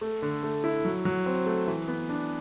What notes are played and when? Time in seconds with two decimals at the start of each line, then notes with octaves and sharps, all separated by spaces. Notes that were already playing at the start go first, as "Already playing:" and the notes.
0.01 A3
0.22 D3
0.43 A3
0.64 E4
0.85 F#3
1.05 F#3
1.26 C4
1.46 A3
1.67 E3
1.88 B3
2.09 D4